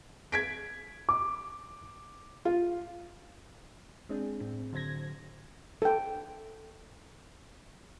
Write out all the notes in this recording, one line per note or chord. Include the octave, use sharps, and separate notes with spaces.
G#6 B6 D7
D6
F4
G#3 C4 D4 G#4
A2 C4
D3 F#3 C5 G#6 A#6
A4 G5